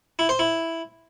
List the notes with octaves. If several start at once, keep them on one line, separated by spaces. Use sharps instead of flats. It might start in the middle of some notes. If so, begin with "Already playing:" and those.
E4
C5
E4